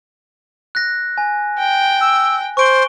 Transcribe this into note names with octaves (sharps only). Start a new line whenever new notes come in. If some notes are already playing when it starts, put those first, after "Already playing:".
F#6 A#6
G#5
G5
E6
C5 C#6 D7 G7